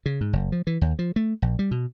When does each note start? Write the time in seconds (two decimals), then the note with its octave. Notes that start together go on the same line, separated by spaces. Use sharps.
0.06 C#3
0.21 G#2
0.33 F#1
0.52 F3
0.67 E3
0.81 D#2
0.99 F3
1.16 A3
1.42 A#1
1.59 G3
1.71 B2